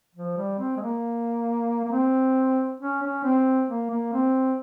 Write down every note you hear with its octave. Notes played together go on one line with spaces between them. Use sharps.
F3
G3
C4
G#3
A#3
A#3
C4
C#4
C#4
C4
A#3
A#3
C4